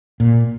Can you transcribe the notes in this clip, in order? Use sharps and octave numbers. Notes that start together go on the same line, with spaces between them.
A#2